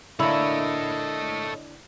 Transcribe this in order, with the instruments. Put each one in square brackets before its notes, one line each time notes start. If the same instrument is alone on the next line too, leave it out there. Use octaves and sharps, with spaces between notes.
[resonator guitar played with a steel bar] D3 A#3 [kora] E4 [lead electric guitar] A4 C#5 [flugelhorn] D#5